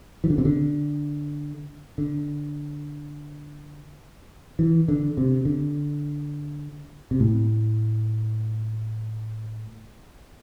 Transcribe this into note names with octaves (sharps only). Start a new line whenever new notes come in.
E3
D3
C3
D3
D3
E3
D3
C3
D3
C3
A2